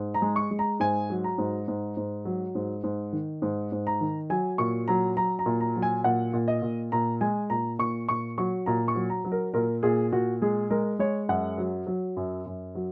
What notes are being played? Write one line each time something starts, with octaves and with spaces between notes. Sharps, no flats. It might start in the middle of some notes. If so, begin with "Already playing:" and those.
Already playing: G#2
A#5
G#3
C#6
G#3
A#5
G#2 G#5
F#3
A#5
G#2
G#2
G#2
F#3
G#2
G#2
D#3
G#2
G#2
A#5
D#3
F#3 G#5
A#2 C#6
F#3 A#5
F#3 A#5
A#5
A#2
A#5
F#3
G#5
A#2 F#5
A#2
D#5
A#2
A#2 A#5
G#3 G#5
A#2 A#5
A#2 C#6
A#2 C#6
F#3 C#6
A#2 A#5
C#6
F#3
A#5
F#3
A#4
A#2 A#4
A#2 G#4
A#2 F#4
G#3 G#4
G#3 A#4
G#3 C#5
F#2 F#5
F#3
F#3
F#2
F#2
F#3